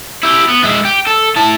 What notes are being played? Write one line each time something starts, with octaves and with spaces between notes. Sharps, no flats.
E4 G4
B3
G#3 E4
G4
A4
E4 A5